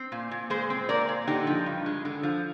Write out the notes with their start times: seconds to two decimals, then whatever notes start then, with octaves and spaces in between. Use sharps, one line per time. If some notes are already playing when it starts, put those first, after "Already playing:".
Already playing: C4
0.12 A#2
0.31 A#2
0.50 G#3 G#4 C5
0.70 C4
0.89 A#2 A#4 D5
1.08 A#2
1.27 D3 D#4 G4
1.47 F3
1.66 G2
1.86 G#3
2.05 D3
2.23 F3